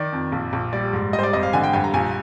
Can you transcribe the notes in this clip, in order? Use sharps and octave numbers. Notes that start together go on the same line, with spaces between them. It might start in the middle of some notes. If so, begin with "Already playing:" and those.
Already playing: D#3 D5
F2
A#1
A#1
G3 D5
G#2
G3 D#5
C5
D5
G#1 D#5
F5
D3 G#5
G5
G2 G#5
A#5
A#1 G#5